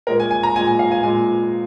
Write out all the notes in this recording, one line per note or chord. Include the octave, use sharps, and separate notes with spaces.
A#2 G#3 A#4
G#5
G#5
A#5
A#2 G#3 G#5
G#5
F5
G#5
A#2 G#3 G#5